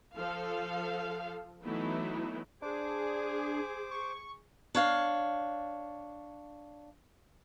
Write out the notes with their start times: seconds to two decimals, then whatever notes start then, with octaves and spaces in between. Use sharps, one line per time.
0.15 F3 A4 F5
1.64 E3 F#3 A3 B3 D#4 E4
2.62 D4 G#4 C5 D6
3.91 C#6
4.75 D4 C#5 F5